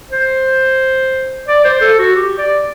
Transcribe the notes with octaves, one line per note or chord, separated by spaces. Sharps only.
C5
D5
C5
A4
F#4
G4
D5